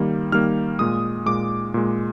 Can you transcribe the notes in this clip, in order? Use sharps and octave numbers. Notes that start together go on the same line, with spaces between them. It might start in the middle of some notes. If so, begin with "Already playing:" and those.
Already playing: D#3 G3 A#3
D#3 G3 A#3 F6
A#2 G#3 D#6
A#2 G#3 D6
A#2 G#3